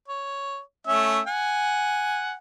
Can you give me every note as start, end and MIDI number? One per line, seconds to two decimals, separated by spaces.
0.08 0.60 73
0.87 1.20 57
0.87 1.20 61
0.87 1.20 76
1.26 2.36 78
1.26 2.36 80